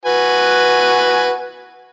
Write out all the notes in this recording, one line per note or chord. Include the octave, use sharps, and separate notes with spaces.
F#4 B4 G#5